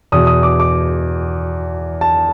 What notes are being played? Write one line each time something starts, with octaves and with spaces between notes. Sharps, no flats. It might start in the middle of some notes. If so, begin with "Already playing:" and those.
E2 B2 D#6
D#6
D6
D6
A5